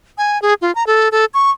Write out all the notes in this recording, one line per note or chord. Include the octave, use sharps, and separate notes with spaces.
G#5
G#4
F4
A#5
A4
A4
C#6